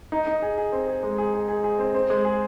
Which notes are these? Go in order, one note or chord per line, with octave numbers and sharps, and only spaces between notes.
D#4
D#4
G#4
G#4
C4
G#4
G#3
G#4
G#4
G#4
G#4
C4
C4
G#3
G#4